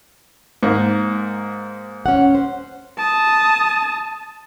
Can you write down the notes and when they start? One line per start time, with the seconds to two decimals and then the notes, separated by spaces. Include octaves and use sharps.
0.63 G#2 A#3
2.06 C#4 F#5
2.35 C5
2.98 A5 D#6